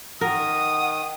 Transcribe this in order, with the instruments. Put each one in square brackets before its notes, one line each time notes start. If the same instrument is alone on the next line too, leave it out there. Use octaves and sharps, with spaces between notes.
[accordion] D#3 [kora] A#4 [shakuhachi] F#5 [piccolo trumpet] D#6